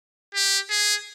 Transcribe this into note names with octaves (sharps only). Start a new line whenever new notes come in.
G4
G#4